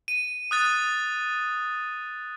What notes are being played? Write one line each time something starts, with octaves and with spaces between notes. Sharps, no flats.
D#7
D#6 F#6 A6